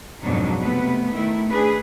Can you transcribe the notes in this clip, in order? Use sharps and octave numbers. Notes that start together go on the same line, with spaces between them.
F2 G#2 B2 F#3 D4 D#4
C3 A3 B3 B4
D#3 A3 E4
A3 D4 G#4 B4